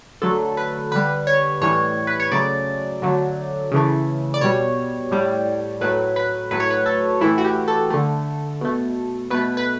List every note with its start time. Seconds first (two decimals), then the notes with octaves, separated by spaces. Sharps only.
0.22 D3 F#3 A3 A4
0.57 B4
0.91 D3 G3 B4
1.27 C#5
1.61 A2 E3 G3 C#5
2.07 B4
2.20 C#5
2.31 C#3 F#3 A3 D5
3.02 D3 F#3 A3
3.71 C#3 E3 A3
4.34 D5
4.41 B2 G3 C#5
5.11 A2 G3
5.81 A2 F#3 A3 B4
6.16 B4
6.51 A2 F#3 A3 B4
6.60 C#5
6.70 B4
6.86 A4
7.21 A2 E3 A3 E4
7.38 F#4
7.44 G4
7.68 A4
7.90 D3 A3
8.61 B2 A3
9.30 B2 A3 B4
9.57 B4